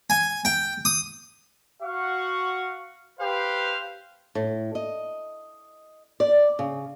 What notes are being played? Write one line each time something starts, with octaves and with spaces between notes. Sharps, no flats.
G#5
G5
D#6
F#4 F5 F#5 C#6
G4 B4 C5 F5
A2
D#5
D5
C#3